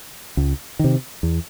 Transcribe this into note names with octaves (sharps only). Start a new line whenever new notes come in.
C#2
C3 D#3
E2